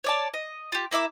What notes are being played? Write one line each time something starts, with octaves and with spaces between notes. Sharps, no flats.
C#5 D5 A5
D#5
F4 G4
A#3 E4 E5 D6